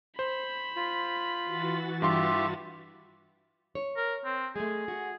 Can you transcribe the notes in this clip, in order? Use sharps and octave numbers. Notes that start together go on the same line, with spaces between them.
C5 B5
F4
E3 F#4 A6
G2 F4 G4 E5 C6
C#5
A#4
C4
G#3 A3 G#4
F#4